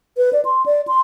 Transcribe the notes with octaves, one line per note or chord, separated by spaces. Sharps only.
B4
D5
C6
D5
C6